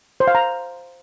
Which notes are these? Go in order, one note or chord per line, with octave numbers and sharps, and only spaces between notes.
C5
F5
A#5